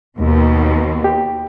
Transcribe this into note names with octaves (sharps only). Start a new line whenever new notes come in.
D#2 B2
G4